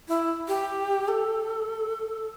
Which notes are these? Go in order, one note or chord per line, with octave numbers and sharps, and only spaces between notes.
E4
G4
A4